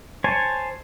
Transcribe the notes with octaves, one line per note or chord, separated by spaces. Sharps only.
C5 C#5 G#5 A5